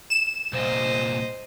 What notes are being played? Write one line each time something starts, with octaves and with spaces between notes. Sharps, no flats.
E7
C2 A#2 C5 D#5